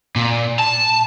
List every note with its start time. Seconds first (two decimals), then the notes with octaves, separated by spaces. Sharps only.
0.16 A#2
0.59 A5